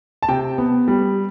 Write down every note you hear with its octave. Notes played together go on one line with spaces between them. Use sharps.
A5
C3 G5
B3
G3